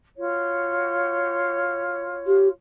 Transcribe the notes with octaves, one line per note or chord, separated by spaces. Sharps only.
F4 F#4 C#5
G4